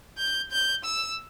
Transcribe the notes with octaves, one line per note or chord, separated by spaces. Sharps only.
G6
G6
E6